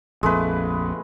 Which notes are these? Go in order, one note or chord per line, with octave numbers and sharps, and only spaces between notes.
A#1 F2 G#3 A3 B4